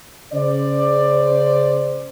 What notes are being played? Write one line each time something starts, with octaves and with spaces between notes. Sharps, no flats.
C#3 C5 D5